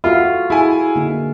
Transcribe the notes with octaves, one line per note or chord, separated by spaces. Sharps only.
F4 F#4 A4 E5
E4 G#4 G#5
D3 A#3 D#4